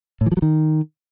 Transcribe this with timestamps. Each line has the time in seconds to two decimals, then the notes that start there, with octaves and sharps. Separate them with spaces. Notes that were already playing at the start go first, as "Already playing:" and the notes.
0.21 A2
0.26 E3
0.32 F3
0.37 F#3
0.42 D#3